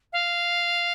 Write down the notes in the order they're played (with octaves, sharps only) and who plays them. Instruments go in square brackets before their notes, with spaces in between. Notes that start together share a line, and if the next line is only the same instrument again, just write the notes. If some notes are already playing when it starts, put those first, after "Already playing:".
[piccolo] F5